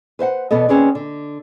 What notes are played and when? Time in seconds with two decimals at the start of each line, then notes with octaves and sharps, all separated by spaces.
0.19 B4 C5 E5 F#5
0.51 E2 B2 B3 A4 D#5
0.69 D#2 C4 C#4 G#4 B4 D5
0.95 D3